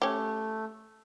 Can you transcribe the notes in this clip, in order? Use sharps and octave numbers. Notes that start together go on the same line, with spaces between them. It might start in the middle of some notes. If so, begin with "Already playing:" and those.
A3 C#4 G4